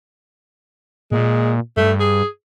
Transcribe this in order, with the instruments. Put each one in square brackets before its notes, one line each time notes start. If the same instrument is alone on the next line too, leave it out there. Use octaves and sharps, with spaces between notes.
[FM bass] A#2 [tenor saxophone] G#3
[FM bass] G2 [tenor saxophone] A3
[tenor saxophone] G#4